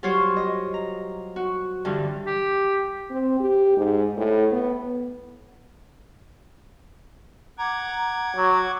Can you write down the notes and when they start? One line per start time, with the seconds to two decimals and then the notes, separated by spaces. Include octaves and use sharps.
0.03 F#3 G3 F4 G4 C5 C#5
0.36 D#5
0.74 A#5
1.36 F#4
1.85 G2 D3 E3 G3
2.26 G4
3.11 C4
3.40 G4
3.77 G#2
4.17 A2
4.52 B3
7.58 F#5 A#5 D6 G#6
8.36 F#3